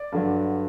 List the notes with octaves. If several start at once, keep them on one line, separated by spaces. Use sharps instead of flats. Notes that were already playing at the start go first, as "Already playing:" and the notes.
Already playing: D5
G2 D3 F#3